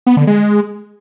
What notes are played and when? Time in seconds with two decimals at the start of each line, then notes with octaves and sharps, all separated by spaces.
0.07 B3
0.17 D3
0.27 G#3